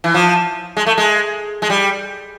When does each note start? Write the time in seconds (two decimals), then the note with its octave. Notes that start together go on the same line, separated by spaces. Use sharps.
0.04 E3
0.14 F3
0.77 G#3
0.86 A3
0.98 G#3
1.62 G#3
1.70 G3